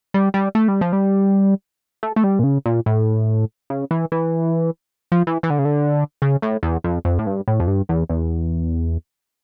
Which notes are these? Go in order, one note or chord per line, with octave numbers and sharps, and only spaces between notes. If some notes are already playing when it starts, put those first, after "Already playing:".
G3
G3
A3
G3
F3
G3
A3
A3
G3
A#2
C#3
A#2
A2
C#3
E3
E3
F3
E3
E3
D3
C#3
D3
C#3
A2
E2
F2
F2
A2
G2
A2
F2
G2
E2
E2